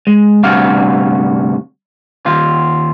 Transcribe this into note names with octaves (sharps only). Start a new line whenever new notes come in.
G#3
D2 G2 C3 F#4 F5
D#2 F4